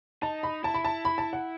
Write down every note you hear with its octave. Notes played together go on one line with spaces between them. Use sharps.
D#4 A5
B5
E4 A5
B5
A5
B5
A5
F#5